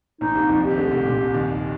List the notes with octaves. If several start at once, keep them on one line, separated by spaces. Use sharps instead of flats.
A#1 A#2 D#4
C2 C3
F2 F3
G4
D#3
D2 D3
C2 C3
A#1 A#2
C2 C3
D#2 D#3